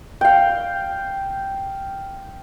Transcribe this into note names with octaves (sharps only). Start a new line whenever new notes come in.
F5 G5